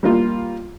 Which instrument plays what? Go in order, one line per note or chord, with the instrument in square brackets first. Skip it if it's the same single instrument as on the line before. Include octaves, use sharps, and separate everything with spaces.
[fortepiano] G3 A#3 F4